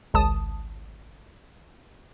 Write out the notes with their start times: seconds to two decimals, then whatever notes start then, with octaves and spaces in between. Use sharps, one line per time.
0.14 G#1 C#2 A5 D#6